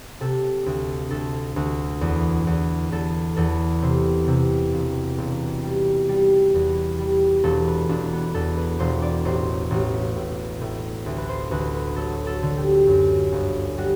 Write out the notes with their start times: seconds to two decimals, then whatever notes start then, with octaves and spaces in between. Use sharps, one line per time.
0.20 C3 A4
0.66 D2
1.11 D2 A4
1.56 D2
2.01 E2
2.47 E2
2.92 E2 A4
3.37 E2 A4
3.82 C3 C5
4.28 C3
4.73 E1
5.18 E1
5.63 G3
6.09 G3
6.54 E2
6.99 G3
7.43 E1 A4
7.67 B4
7.89 E1 D4
8.13 B3
8.34 E2 A4
8.57 B4
8.80 E1 C5
9.02 D5
9.25 A1 C5
9.71 A1
10.16 A2
10.61 A2
11.06 D2
11.18 B4
11.29 C5
11.51 D2 B4
11.74 B4
11.96 F#3 A4
12.27 A4
12.43 D3
12.57 G4
12.87 F#2
13.32 G1
13.78 G3 F#4